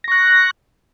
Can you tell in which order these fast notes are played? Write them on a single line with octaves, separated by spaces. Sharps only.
A#6 C#6 F#6